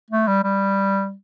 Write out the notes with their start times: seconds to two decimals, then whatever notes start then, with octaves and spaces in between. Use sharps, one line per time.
0.11 A3
0.27 G3
0.44 G3